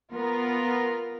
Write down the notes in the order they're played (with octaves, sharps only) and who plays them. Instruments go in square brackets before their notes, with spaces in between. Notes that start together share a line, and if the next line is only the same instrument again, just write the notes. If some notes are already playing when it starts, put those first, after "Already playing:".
[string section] B3 F4 A#4